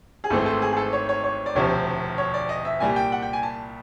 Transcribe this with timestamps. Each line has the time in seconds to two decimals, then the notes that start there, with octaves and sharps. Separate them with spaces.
0.24 G#4
0.30 G#1 G#2 E3 A3 C4 A4
0.46 A4
0.62 G#4
0.73 G#4
0.77 A4
0.93 C#5
1.09 C#5
1.24 C#5
1.46 D5
1.55 E1 D2 C3 F3 C#5
2.18 C#5
2.34 D5
2.49 D#5
2.65 E5
2.80 C2 A#2 G3 G#5
2.96 G5
3.12 F#5
3.22 G5
3.33 G#5
3.43 A5